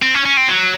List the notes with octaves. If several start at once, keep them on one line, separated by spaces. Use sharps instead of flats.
C4
C#4
C#4
C4
F#3